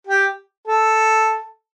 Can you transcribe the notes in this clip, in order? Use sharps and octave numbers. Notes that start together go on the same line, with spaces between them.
G4
A4